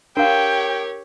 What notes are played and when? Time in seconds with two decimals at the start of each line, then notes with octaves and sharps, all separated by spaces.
0.17 D4 G4 A#4 C#5 F5 G5